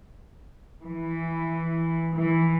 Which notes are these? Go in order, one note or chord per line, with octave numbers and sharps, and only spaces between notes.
E3
E3